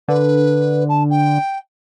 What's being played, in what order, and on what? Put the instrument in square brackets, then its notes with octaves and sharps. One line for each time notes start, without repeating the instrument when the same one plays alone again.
[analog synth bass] D3 [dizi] B4
[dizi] A5
G5